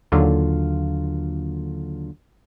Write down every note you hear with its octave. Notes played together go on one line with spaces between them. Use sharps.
D#2 D3 F#3 F4